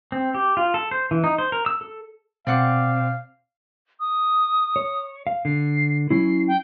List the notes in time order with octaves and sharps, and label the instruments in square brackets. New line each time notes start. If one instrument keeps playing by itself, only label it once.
[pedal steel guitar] C4
G4
F4
A4
C5
E3
D#4
C5
A#4
E6
A4
[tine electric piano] B2 [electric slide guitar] C4 [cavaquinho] D5 F#5 D6 [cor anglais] F5
[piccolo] D#6
[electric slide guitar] C#5
F5
[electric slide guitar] D3 [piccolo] C7
[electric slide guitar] F#3 C#4 E4 [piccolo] C7
[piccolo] G5